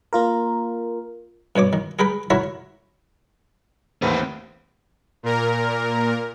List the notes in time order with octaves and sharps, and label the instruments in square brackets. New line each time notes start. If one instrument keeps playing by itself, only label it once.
[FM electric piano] A#3 F4 A#4
[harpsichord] G2 B2 C#5 D6
D#3
G#4 A#4 B4 G5 B5
E4 F#4 A#4 C#5 E5
[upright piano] A1 D#2 [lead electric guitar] C4 B4
[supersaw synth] A#2 A#4